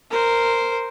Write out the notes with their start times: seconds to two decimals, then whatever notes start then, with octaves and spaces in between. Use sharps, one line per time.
0.11 A#4 C5